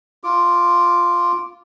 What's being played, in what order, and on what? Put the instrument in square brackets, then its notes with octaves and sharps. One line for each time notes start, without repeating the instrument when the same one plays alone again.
[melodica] F4 D6